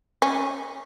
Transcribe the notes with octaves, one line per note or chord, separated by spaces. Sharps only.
C#4